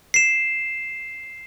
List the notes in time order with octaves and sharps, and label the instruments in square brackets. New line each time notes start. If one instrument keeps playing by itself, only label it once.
[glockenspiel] C7 E7